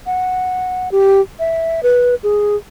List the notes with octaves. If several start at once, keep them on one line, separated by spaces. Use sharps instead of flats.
F#5
G4
E5
B4
G#4